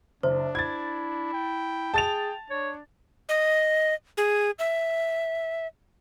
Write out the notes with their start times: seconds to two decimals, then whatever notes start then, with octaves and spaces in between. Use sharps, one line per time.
0.23 F#1 D4 C5
0.55 E4 G#6 A6
1.34 G5
1.94 G#4 A5 A6 F7
2.50 D4 C#5
3.29 D#5
4.17 G#4
4.59 E5